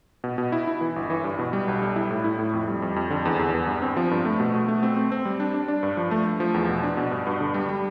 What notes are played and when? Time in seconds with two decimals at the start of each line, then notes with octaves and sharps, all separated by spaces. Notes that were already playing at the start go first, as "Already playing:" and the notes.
0.24 B2
0.38 B2
0.52 E4
0.67 E4
0.81 E3
0.96 G1
1.10 E3
1.24 G2
1.39 B2
1.53 G3
1.68 B1
1.82 G3
1.96 E4
2.11 A2
2.24 E4
2.39 A2
2.53 F2
2.68 G3
2.82 F2
2.96 F2
3.10 D3
3.25 E2
3.39 E2
3.54 B3
3.67 G2
3.82 C4
3.97 F3
4.11 G2
4.25 A3
4.40 B2
4.54 B2
4.68 A3
4.83 C4
4.96 C4
5.12 C4
5.25 G3
5.40 D4
5.54 D4
5.68 D4
5.83 G2
5.97 F3
6.11 A3
6.26 A3
6.40 F3
6.54 E2
6.69 B2
6.83 D4
6.97 B2
7.11 G2
7.27 G2
7.41 D3
7.54 G3
7.69 G3